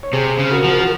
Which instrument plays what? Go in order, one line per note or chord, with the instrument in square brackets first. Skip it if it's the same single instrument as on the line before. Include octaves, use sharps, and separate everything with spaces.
[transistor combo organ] C#5
[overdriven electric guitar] C3 [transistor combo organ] G#4 C5
[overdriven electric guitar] C#3
[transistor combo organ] F#4 A#4
[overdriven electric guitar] F3